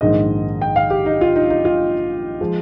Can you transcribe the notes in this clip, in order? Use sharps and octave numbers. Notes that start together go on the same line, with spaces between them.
A#1 G#2 D#3 G#3 D#5
G5
F5
G4
D#4
F4
D#4
D#4
F4
F3 G#3